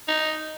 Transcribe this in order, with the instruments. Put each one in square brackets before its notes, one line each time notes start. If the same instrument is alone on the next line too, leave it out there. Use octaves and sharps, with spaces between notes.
[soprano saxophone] D#4